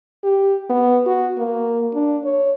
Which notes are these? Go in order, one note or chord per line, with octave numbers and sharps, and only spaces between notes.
G4
B3
F#4
A#3
D4
C#5